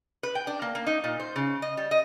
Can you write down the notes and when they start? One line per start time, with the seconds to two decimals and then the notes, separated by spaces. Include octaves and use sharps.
0.23 B4
0.35 G5
0.47 D4
0.62 A#3
0.75 A#3
0.87 D#4
1.04 A#2
1.20 C5
1.36 C#3
1.62 D#5
1.77 G3
1.91 D#5